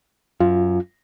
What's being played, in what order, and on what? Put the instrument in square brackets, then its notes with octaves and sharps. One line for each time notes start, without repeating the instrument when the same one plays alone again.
[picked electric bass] F#2 [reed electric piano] F4